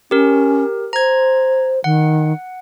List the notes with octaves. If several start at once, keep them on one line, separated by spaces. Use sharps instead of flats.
C#4 G4 A#4
C5 A#5 G#6
D#3 F#5